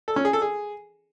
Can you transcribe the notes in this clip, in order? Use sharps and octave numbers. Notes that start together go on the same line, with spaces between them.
A4
C#4
G#4
A4
G#4